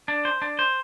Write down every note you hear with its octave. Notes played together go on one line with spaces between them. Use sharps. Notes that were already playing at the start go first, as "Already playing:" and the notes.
D4
C5
D4
C5